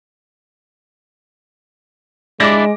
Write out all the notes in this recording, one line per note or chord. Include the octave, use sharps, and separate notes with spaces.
G#3 D4 E4 D5 D6 A#6